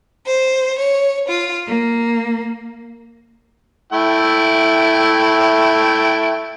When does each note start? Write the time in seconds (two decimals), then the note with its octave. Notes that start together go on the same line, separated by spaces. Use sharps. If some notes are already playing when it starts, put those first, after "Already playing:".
0.25 C5
0.78 C#5
1.28 F4
1.67 A#3
3.93 A3 E4 G5